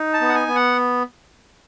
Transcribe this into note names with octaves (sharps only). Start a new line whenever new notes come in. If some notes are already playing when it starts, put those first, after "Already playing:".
Already playing: D#4
A5
B3
F#5
G#5
B3
F#5